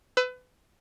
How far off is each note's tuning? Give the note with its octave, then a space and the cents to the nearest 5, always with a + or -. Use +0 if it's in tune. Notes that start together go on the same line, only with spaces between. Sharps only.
B4 +30 E6 +0